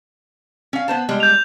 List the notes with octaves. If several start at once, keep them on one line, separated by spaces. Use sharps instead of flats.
C#4 F5
B3 C5 A5
G3 G#3
G6 F7